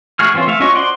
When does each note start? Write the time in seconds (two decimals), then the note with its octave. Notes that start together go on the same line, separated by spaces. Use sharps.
0.19 A3 F#4 G#4 F6
0.34 E3 C4 C#4 F4
0.47 A3 E5 F5
0.60 C#4 F4 F#4 D#5 C#6
0.75 C5 D5 D#5 F#5 C6